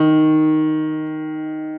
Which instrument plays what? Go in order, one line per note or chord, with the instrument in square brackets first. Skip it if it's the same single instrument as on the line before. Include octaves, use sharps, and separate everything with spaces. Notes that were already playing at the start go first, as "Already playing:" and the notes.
Already playing: [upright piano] D#3